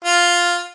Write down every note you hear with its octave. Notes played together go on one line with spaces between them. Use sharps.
F4